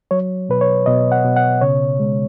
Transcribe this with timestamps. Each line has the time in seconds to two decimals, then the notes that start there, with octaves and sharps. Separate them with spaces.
0.11 F#3 C#5
0.49 B2 B4
0.61 C#5
0.86 B2 D#5
1.12 F#5
1.25 B2
1.36 F#5
1.61 C#3 C#5
2.00 G#3